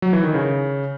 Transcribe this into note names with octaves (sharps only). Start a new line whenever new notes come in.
F#3
E3
D#3
C#3